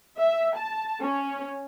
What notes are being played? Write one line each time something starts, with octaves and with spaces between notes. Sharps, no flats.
E5
A5
C#4